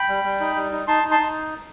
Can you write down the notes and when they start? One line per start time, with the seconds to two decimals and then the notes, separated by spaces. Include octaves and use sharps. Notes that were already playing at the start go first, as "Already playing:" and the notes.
Already playing: G5 B5
0.09 G3
0.24 G3
0.40 D#4
0.56 G3
0.72 D#4
0.87 D#4 A5 C6
1.04 D#4
1.11 A5 C6
1.19 D#4